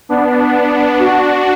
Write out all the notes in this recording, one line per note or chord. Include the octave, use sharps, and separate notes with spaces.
B3 D4
D4 F#4